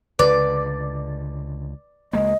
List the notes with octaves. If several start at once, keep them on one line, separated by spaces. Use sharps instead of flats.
C#2 D3 B4 D5
C#2 G#3 A#3 D#5